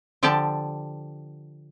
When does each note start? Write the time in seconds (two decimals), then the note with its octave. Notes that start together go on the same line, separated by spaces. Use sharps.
0.23 D3 F3 G4 D5 G5 A5